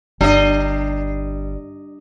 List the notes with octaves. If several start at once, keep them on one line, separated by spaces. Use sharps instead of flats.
G1 G3 D4 D#5